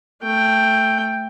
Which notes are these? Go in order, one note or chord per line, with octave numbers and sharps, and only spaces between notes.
A3 G5